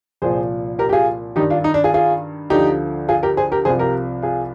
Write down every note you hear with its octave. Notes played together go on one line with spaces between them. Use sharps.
C2 A#2 F3 G#4 C5
G4 A#4
G4
F4 G#4
G2 D#3 D#4 G4
D4 F4
D#4
D4
F4 G#4
F4 G#4
D2 D3 F3 D#4 G4
F4 G#4
G4 A#4
G#4 C5
G4 A#4
C2 C3 F3 G#4 C5
G4 A#4
F4 G#4